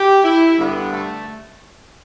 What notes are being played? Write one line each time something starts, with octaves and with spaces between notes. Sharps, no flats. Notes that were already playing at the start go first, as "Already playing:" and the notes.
Already playing: G4
E4
G2 D3 B3
A3